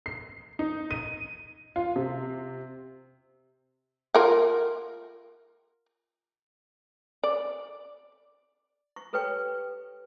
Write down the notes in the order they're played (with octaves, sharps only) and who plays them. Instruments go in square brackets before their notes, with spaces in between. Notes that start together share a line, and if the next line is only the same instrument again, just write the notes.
[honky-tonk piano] C7
D#4
D#7
F4
C3
[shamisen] F4 A#4 F#5
D5
[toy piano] C#6
G4 A4 B4 C#5 G5 C#6